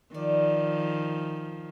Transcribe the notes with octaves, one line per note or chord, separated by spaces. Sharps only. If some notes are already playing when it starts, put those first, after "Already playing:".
D#3 F3 D5